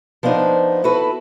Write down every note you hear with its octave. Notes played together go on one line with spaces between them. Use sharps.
F3 B3 D4 D#4 C5
E4 F#4 A4 B4